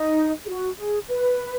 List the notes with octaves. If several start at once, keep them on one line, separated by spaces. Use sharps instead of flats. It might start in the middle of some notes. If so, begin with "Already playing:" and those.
Already playing: D#4
G#4
F#4
G#4
B4